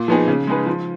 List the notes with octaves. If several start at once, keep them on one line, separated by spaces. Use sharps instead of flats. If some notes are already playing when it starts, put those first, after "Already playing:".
Already playing: A#2
F3 B3 D#4 G#4
C#3
G#3 D#4 G#4 B4
F3